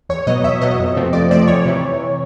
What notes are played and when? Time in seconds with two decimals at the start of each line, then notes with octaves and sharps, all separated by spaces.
0.09 E2 C#5
0.27 B2 F#3 B3 D#5
0.44 E2 E5
0.62 B2 F#3 B3 D#5
0.79 F2
0.96 C3 F3 A3 C4
1.13 F2 D5
1.31 C3 F3 A3 C4 D5
1.48 E2 C#5
1.66 C3 E3